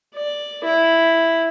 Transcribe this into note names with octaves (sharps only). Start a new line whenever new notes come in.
D5
E4